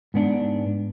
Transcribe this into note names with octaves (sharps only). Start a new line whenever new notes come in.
G#2 B3 D4